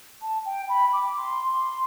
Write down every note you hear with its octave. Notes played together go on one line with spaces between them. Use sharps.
A5
G5
B5
D6
C6